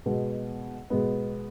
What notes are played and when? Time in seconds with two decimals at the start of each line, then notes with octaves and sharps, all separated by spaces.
0.06 B2 G#3 B3
0.90 B2 G#3 B3